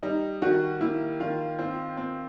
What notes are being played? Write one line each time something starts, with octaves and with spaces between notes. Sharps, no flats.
G3 D#4
D#3 F#4
A#3 E4
D#3 F4
C4 F4
C4